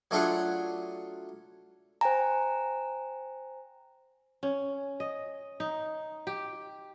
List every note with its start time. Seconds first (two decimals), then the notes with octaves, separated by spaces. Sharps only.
0.11 F#3 A3 D4 F4 G#4 F#5
2.01 C5 G5 G#5 A#5
4.43 C#4
5.00 D#5
5.60 D#4
6.27 G4